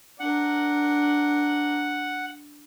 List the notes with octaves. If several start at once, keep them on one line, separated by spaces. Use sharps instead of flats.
D4 A#4 F#5